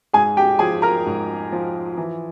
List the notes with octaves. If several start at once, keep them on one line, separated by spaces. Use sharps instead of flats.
G#2 G#4 G#5
G4 G5
F3 G#4 G#5
A#4 A#5
G#2
F3
E3